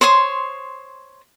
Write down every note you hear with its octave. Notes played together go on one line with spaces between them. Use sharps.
C5 C#5 C6 D#6